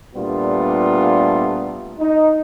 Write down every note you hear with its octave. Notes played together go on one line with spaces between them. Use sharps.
A#2 G3 A3 B3 D4 F4
D#4